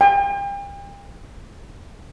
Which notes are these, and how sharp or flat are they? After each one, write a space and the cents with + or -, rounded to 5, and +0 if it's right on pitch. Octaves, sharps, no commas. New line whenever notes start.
G5 +35